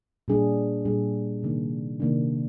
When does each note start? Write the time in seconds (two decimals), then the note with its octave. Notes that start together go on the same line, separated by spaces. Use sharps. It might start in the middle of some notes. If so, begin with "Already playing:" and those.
0.28 A#2 G3 D4 G#4
0.85 A#2 G3 D4 G#4
1.43 C3 D#3 A#3 D4
2.00 C3 D#3 A#3 D4